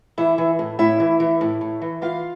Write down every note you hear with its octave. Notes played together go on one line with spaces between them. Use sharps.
E3 E4 E5
E3
A2
A2 E4 E5
E3
E3
A2
A2
E3
E3 F4 F5